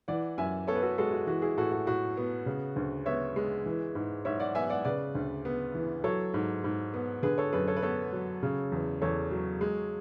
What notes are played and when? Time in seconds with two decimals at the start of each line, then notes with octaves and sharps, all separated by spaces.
0.08 E3 D5 F#5
0.38 F#2 E5 G#5
0.68 B3 A4 C#5
0.75 B4
0.83 F#4 A4
0.98 G#3 F#4 A4
1.12 F#4
1.27 E3 F#4
1.42 E4 G#4
1.57 A2 F#4 A4
1.72 F#4
1.86 A2 F#4
2.17 B3
2.46 C#3
2.76 D2
3.06 B3 C#5 E5
3.36 G#3
3.66 E3
3.95 G#2
4.25 G#2 C#5 E5
4.40 D5 F#5
4.55 B3 E5 G#5
4.70 D5 F#5
4.85 C#3 B4 D5
5.15 D2
5.45 B3
5.75 E3
6.04 F#3 A4 C#5
6.34 G#2
6.64 G#2
6.94 B3
7.23 D3 G#4 B4
7.38 A4 C#5
7.52 F#2 G#4 B4
7.67 A4 C#5
7.77 B4
7.82 B3 A4 C#5
8.13 F#3
8.43 C#3
8.72 E2
9.02 E2 A4 C#5
9.31 F#3
9.61 G#3